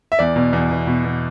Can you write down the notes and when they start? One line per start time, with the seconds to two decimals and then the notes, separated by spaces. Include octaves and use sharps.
0.12 E5
0.19 E2 D5
0.36 B2
0.53 E2
0.71 B2
0.87 B2
1.04 B2